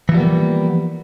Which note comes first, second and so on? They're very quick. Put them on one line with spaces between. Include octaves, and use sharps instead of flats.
E3 F3 G3 B3 A#3